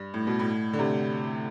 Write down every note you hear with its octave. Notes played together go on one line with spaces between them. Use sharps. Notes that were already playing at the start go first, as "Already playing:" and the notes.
Already playing: G2
A2
B2
A2
D3
C3